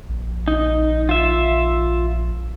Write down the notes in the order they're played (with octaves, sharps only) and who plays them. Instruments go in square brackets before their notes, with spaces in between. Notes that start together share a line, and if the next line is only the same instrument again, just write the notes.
[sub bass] A#1
[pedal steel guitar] D#4
F4 E5